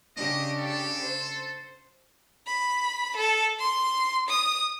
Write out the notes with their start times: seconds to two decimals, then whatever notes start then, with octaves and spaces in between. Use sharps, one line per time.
0.17 C#3 D4 G4 D#5
0.58 A4
1.02 C5
2.47 B5
3.17 A4
3.59 C6
4.28 D#6